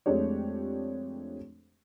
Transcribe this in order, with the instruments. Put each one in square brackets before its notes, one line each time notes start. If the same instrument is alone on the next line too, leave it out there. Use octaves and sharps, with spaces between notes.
[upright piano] F2 G#3 A3 D4 G4 C#5